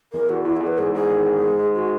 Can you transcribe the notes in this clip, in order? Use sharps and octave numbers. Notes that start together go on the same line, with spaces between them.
E2 A#4
E2 F#4
E2 E4
G#4
E2
B4
G#2 G#4
G#2 G#4
D#3
G#2
G#3
G#3
G#3 F#4